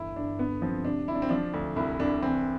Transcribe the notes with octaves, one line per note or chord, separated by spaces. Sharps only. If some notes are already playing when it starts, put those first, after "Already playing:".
Already playing: G1 E3 E4
G1 D4
D3 B3
F3 C4
C3 D4
C3 E4
D4
C4
F3 D4
D2
C2 E4
C2 D4
E3 C4